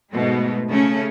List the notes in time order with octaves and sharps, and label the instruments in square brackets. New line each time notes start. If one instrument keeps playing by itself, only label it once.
[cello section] G#2 B2 A3
C#3 A3 C#4